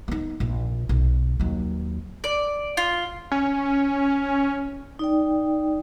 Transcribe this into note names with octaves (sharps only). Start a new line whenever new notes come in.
B3 D#4
A#1
B1
D#2 F#3
D5
F4
C#4
D#4 D5 G5